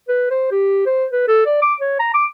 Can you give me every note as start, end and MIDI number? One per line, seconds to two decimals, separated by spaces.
0.08 0.27 71
0.30 0.48 72
0.51 0.85 67
0.86 1.06 72
1.11 1.25 71
1.28 1.45 69
1.46 1.59 74
1.62 1.75 86
1.80 1.99 73
2.00 2.12 82
2.14 2.25 86